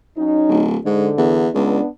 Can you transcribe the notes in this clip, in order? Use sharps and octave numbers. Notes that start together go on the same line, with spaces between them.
F#3 C#4 D#4
D1
G#2 D3
E2
C#2 B3 D4